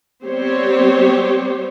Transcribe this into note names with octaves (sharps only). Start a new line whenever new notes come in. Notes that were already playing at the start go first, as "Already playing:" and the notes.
G3 B3 C4 G4 C5 C#5